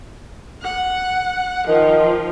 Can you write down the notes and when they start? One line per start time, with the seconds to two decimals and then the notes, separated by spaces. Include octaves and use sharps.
0.62 F#5
1.68 D#3 F3